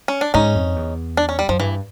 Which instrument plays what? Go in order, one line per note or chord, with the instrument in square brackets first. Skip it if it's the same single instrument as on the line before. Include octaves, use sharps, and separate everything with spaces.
[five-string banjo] C#4
D4
[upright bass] G#2 [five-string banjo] C#4 D#4
[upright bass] F2
E2
[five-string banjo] D4
C#4
G3
[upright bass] F#2 [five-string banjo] F3
[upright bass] G2 [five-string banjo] E3